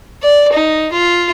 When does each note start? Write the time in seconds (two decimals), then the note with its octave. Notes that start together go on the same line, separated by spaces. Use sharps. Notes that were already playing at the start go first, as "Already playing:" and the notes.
0.23 D5
0.53 D#4
0.93 F4